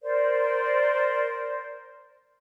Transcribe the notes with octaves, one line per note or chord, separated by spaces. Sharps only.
A#4 C5 D5